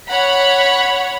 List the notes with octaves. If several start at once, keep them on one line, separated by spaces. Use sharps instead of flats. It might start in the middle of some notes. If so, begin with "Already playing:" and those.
C#5 F#5 B5